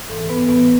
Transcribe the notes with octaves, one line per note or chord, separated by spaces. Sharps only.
G#2 E3 A4
B3 B4
A2 E3 B3 B4